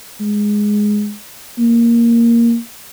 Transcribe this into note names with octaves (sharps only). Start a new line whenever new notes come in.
G#3
A#3